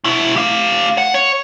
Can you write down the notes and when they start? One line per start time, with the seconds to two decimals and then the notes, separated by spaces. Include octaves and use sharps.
0.04 B2 E4
0.36 G4 F5
0.98 F#5
1.14 C#5